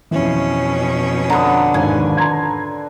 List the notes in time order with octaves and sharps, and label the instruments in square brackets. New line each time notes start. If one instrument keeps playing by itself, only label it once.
[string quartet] F2 B2 C#4 [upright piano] E3
[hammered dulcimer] D3 B4 [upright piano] A#5 D#6
[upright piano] G#1 D#2 [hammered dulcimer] G#5
[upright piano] A#5 C6 G#6